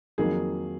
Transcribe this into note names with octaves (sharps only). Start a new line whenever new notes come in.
F2 D#3 F#3 A#3 G#4